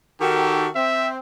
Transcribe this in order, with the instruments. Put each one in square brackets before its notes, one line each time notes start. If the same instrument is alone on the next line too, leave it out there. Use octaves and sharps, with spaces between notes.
[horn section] D#3 F#4 A4 [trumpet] G4
[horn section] C4 [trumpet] E5